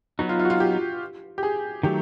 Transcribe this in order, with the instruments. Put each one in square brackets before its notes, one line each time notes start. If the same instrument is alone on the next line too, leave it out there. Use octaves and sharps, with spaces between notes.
[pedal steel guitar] F#3 B3 D#4 [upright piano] F#4
[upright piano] F4
F4
F#4
F4
G4
G4
G#4
[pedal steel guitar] D#3 F#3 A3 [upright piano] G4